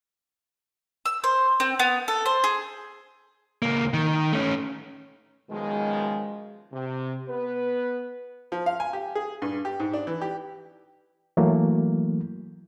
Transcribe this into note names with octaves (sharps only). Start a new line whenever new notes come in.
E6
C5
C4
B3
A4
C5
G#4
C#2 A#3
D#3
A3 C#4
F#2 B2 D#3 F3 G#3
C3
B3 B4
F3
F5
G#5
G4
G#4
G2
G4
G#2
D4
E3
G4
E3 F#3 A3 A#3